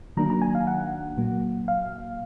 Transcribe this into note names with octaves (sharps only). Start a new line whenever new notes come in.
D#3 F#3 A#3 D4 A#5
A#5
G#5
F5
F#5
A#2 F#3 A#3
F5